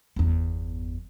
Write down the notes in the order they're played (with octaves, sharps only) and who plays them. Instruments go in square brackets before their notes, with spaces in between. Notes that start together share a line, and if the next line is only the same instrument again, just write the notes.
[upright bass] G1 E2